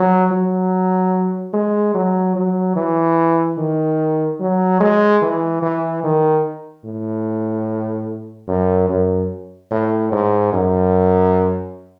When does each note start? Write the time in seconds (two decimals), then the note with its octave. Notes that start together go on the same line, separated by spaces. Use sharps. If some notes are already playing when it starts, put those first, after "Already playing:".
Already playing: F#3
0.31 F#3
1.53 G#3
1.94 F#3
2.35 F#3
2.76 E3
3.57 D#3
4.40 F#3
4.80 G#3
5.22 E3
5.62 E3
6.03 D#3
6.84 A2
8.48 F#2
8.89 F#2
9.71 A2
10.12 G#2
10.53 F#2